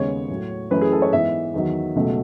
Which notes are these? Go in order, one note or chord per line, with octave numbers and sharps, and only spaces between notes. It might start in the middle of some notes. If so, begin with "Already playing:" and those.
Already playing: D#2 C#3 G#3 B3 C#5
A2 F#3 A3
F#2 E3 A3 B4
G#4
A4
C#5
G#2 E3 B3 E5
E2 D#3 F#3
C#2 B2 F#3 A3